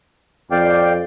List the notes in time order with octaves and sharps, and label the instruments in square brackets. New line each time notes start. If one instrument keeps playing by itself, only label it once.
[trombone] F2 [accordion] D5 F5 G5